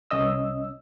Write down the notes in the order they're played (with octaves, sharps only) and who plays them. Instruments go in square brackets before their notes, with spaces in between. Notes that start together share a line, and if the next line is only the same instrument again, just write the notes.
[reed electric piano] C2 C#4 D#5 E6